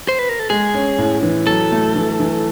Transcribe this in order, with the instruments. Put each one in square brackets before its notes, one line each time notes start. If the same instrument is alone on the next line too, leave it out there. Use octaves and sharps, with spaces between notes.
[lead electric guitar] C5
B4
A#4
A4
[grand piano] G#3 [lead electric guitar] G#4
[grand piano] C#4
A2
E3
[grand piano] F#3 [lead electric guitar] A4
[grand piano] A3
E3
E3